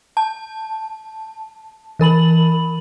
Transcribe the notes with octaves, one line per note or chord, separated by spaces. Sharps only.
A5
E3 A#4 B5 F#7